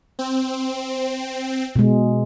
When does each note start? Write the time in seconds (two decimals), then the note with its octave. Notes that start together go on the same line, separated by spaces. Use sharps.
0.19 C4
1.76 B2 G#3